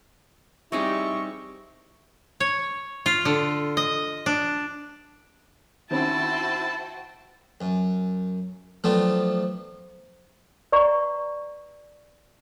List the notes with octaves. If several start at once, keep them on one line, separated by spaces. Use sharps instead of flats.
G3 C4 D#4 E4 G#4 C#6
C#5
F4
D3
D#5
D4
D#3 C4 C#4 E4 F#4 C5 G5 A5
F#2
F3 F#3 A3 B3 C4 D4
B4 D5 A#5 C#6